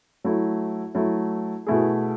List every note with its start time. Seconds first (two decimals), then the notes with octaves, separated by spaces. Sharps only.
0.24 F#3 A3 E4
0.95 F#3 A3 E4
1.67 B2 A3 E4 G#4